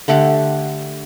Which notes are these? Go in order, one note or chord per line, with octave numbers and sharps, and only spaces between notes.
D3 A3 G4 F#5